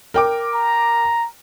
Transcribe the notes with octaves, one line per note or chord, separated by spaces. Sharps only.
A#4 G5 D6
A#5